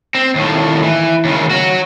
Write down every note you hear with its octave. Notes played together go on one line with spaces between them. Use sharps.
C4
D#2 A2
E3
D#2 C#3
F#4 C#5